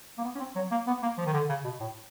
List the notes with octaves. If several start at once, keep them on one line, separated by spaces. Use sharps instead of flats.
A#3
B3
C#4
C4
F#3
A#3
B3
A#3
F3
D#3
D3
C#3
B2
A2